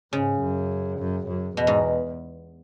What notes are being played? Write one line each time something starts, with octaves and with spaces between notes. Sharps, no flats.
G#2 C#3
F#2
F#2
F#2
E2 B2
G#2